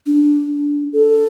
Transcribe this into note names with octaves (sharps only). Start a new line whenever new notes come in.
D4
A4